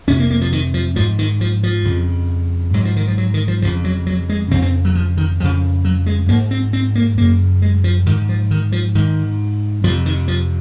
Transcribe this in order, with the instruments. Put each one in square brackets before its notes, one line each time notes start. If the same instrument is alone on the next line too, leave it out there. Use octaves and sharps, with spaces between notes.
[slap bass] F2 C3 C#4
A#3
A#3
F3
D#3
F3
G#2 F3
D#3
F3
F3
F2 C#3
G#2 F#3
F3
D#3
F3
F#3
D#3
F3
F2 C#3 F3
F#3
F#3
G#3
F2 C#3 C4
C4
F#3
F3
D#3
F2 C#3 F3
F#3
G#3
G#2 A#3
C4
C4
A#3
F#2 C#3 A#3
G#3
F3
G#2 D#3
F3
D#3
F3
G#2 D#3
F2 F3
C3
D#3
F3